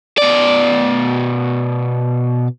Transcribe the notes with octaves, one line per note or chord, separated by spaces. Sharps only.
B2 D5